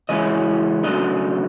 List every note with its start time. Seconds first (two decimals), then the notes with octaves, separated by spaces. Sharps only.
0.09 C#3 E3 G#3 C#4 E4 D#5
0.84 C#3 F#3 A3 D4 D#5